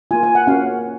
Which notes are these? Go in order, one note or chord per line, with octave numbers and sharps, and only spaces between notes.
A#3 F4 G#5
G#5
F#5
A#3 C#4 F#4 F5